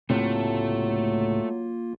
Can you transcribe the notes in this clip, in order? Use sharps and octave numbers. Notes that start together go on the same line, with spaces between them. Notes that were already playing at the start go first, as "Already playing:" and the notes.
C#2 A2 C3 F#3 A3 A#3 F4